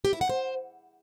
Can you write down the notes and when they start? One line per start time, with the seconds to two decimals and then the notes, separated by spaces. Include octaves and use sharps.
0.05 G4
0.13 E4
0.21 F#5
0.29 C5